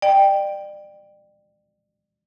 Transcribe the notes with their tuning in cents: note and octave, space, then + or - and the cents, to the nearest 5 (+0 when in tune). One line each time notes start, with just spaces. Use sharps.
D5 +35 G5 +0